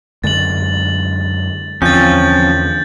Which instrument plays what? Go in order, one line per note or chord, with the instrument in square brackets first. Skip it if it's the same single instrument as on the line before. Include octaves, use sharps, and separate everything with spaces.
[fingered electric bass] F#2 D3 G#3 [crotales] A6 F#7
[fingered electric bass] E2 D3 [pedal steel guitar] F3 C4 C#4 [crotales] G6 A6